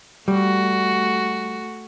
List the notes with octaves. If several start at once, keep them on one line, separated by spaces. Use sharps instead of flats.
G3 A3 F#4